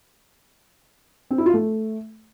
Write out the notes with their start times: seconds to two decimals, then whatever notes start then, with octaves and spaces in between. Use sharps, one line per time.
1.31 C4
1.38 E4
1.46 F4
1.54 A3